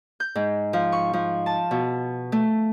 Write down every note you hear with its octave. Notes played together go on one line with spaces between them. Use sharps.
G6
G#2
F3
C#6
F3
A5
B2
A3